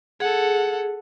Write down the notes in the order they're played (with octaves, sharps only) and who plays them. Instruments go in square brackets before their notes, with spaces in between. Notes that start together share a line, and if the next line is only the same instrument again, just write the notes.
[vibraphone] G#4 [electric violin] A4 F#5